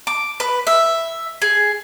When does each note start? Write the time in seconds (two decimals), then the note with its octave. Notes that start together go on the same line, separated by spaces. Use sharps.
0.07 D6
0.40 B4
0.67 E5
1.42 G#4